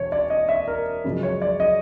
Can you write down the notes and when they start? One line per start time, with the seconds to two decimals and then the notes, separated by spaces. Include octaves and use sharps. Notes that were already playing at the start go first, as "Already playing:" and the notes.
Already playing: E1 C#5
0.12 D5
0.30 D#5
0.49 E5
0.68 A#4
1.04 F#2 C#3 F3 G#3
1.23 C#5
1.42 D5
1.60 D#5